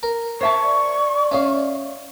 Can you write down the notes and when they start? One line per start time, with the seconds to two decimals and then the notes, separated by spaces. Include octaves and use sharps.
0.03 A#4
0.41 C5 E5 A5 C#6
0.63 D5
1.31 C#4 G#4 E5 F5